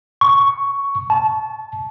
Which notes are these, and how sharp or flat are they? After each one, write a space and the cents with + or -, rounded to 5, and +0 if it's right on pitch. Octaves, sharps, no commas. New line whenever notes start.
C#6 +5
A5 -25